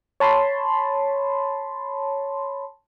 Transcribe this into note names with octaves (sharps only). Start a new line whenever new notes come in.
C#5 A5 B5 C6